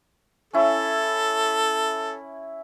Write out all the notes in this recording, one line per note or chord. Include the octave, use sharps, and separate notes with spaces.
C#4 E4 A4 C#5